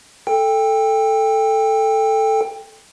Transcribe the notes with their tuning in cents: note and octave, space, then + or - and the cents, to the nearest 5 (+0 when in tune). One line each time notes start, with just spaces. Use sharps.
A4 +0 G5 +20